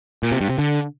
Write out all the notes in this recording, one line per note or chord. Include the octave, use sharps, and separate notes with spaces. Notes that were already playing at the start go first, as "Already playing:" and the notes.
A#2
C3
G2
C3
D3